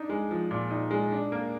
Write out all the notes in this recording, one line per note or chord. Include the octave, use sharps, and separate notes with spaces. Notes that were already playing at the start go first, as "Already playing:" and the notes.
Already playing: D4 D#4
G#3
F3
A#2
D#4
G#3
D4
A#3